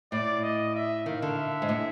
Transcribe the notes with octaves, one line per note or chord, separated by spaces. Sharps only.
A2 D5
D#5
E5
D#3 F5
D3
E5
G#2
A2